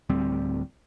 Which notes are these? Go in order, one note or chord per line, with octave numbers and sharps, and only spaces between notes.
D1 D2 G3 C4